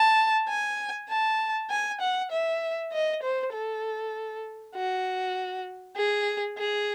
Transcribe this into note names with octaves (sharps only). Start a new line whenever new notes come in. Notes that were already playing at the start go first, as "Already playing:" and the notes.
Already playing: A5
G#5
A5
G#5
F#5
E5
D#5
C5
A4
F#4
G#4
G#4